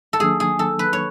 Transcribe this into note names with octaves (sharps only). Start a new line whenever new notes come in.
A4
D#3 F#3 A#3 D4 G#4
G#4
A4
B4
C#5